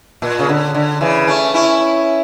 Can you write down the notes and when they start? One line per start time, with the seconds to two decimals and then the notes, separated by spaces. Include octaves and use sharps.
0.22 A#2
0.39 C#3
0.49 D3
0.75 D3
1.01 C#3 E3
1.27 A3 C#4
1.54 C#4 E4